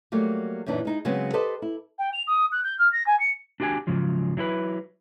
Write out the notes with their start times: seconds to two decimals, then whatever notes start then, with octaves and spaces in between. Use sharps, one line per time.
0.12 F#3 G3 A3 A#3
0.66 F#2 A#2 E3 D4 D#4
0.85 G#3 D#4 E4
1.05 C#3 F#3 G#3 B3 C4
1.33 G4 A4 B4 C5 D#5
1.62 E4
1.98 G5
2.13 F7
2.27 D#6
2.52 F#6
2.64 G6
2.78 F6
2.92 A#6
3.06 G#5
3.19 C#7
3.60 D4 F#4 G4 D5 G#5
3.87 G#2 C#3 F3 F#3
4.37 F#3 E4 A4 B4